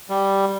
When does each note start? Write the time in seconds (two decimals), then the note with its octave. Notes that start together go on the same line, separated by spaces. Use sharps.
0.09 G3